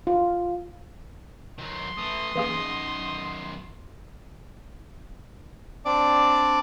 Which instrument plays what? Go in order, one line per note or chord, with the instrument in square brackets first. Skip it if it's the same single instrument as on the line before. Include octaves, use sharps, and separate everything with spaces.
[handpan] F4
[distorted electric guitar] D#3 F#3 [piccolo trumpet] C6
[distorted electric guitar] A2 E3 [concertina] D#6
[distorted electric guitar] F#2 D#3 [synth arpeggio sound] E3 A#3 G#4
[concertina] C4 D4 D5 D6